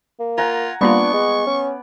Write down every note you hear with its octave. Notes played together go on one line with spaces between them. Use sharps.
A#3
F4 F#5 G#5 A#5
G3 A#3 B3 D4 F4 D5 C#6
G#3
C#4